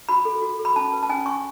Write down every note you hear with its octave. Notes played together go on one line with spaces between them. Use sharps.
F#4 B5
A4
F#4
A4
B5
C#4 A5
B4
A5
C#4 G#5
C#4 C#6